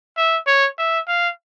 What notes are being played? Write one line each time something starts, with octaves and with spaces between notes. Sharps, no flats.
E5
C#5
E5
F5